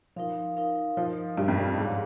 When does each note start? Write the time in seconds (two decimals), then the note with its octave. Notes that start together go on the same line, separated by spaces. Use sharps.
0.16 F3 D#4 A#4 F5
0.57 D#4 A#4 F5
0.97 F3 D#4 A#4 D#5
1.37 G2 D#4 A#4 D#5
1.48 F2
1.58 G2
1.78 G#2 D#4 G4 C#5 F5